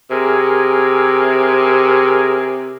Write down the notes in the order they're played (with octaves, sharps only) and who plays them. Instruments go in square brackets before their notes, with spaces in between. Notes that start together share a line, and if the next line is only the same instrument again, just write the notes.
[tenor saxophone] C3 [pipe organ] G#4 A#4